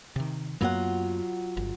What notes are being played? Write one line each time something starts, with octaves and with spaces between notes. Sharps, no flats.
C3 D#3
F#2 F#3 A#3 B3 F4 F#5
G1